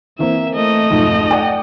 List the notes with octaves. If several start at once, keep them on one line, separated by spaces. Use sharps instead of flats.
E3 A#3 C4 E5
A3 D#5
B1 F2 G#2
D5 F#5 G5